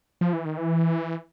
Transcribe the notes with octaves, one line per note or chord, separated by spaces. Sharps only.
F3
E3
D#3
E3